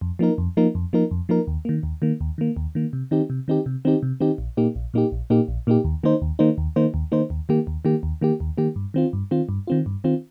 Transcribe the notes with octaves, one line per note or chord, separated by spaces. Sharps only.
F2
F3 A#3 D#4 A#4
F2
F3 A#3 D#4 A#4
F2
F3 A#3 D#4 A#4
F2
F3 A#3 D#4 A#4
D#2
D#3 A#3
D#2
D#3 A#3
D#2
D#3 A#3
D#2
D#3 A#3
C3
D#3 C4 D#4 G4
C3
D#3 C4 D#4 G4
C3
D#3 C4 D#4 G4
C3
D#3 C4 D#4 G4
A#1
A#2 A#3 D#4 G4
A#1
A#2 A#3 D#4 G4
A#1
A#2 A#3 D#4 G4
A#1
A#2 A#3 D#4 G4
D#2
D#3 A#3 D#4 C5
D#2
D#3 A#3 D#4 C5
D#2
D#3 A#3 D#4 C5
D#2
D#3 A#3 D#4 C5
D#2
D#3 A#3 G4
D#2
D#3 A#3 G4
D#2
D#3 A#3 G4
D#2
D#3 A#3 G4
G2
D#3 C4 F4
G2
D#3 C4 F4
G2
D#3 C4 F4
G2
D#3 C4 F4